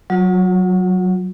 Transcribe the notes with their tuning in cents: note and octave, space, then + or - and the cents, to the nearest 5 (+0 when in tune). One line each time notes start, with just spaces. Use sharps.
F#3 +0 F4 +45